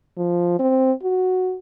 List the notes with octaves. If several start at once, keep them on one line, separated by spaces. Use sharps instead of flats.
F3
C4
F#4